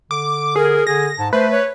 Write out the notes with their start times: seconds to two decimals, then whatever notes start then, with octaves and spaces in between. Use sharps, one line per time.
0.11 D3 D6
0.56 G#4 A#4
0.87 D3 G#4 A#6
1.18 G#2 A5
1.33 A3 B4 C5
1.51 C#5